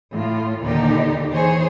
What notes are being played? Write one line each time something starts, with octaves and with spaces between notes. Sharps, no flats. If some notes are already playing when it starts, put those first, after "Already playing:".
A2 F4
D#2 A#2 D3 D#4 G4
E3 G#4 C5 C#5